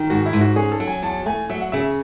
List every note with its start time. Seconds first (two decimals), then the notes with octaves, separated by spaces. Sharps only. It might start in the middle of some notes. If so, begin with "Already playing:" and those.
Already playing: D#3
0.10 G#2 F#4
0.26 E4
0.33 G#2
0.41 F#4
0.56 C#4 G#4
0.72 A4
0.80 F#3
0.88 G#5
1.02 E2 A5
1.26 A3 G#5
1.50 F#3 E5
1.61 F#5
1.72 C#3 E5